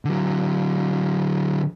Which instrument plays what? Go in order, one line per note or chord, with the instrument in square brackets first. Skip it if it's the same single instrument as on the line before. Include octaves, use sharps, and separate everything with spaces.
[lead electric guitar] D3 F#3